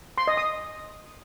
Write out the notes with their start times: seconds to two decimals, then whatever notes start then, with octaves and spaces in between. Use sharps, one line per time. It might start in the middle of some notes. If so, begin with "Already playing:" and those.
0.18 C6
0.27 D#5
0.37 D#6